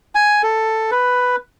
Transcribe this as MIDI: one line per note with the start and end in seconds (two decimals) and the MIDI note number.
0.15 0.42 80
0.43 0.91 69
0.91 1.36 71